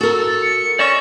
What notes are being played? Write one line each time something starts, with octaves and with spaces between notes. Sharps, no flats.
F#4 A4 A#4 A6
C#7
C#4 D5 D#5 C#6 E7